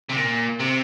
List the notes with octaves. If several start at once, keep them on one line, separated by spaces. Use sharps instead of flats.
C3
A#2
C3